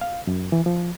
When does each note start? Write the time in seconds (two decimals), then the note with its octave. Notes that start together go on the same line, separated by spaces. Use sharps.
0.01 F5
0.27 F#2
0.52 E3
0.66 F3